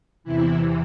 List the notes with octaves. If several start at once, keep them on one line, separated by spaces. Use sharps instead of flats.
E2 C3 E3 E4